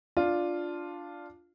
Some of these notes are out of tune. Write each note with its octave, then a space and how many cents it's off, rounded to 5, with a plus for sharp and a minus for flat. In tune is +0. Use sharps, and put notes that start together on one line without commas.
D4 +0 F4 +0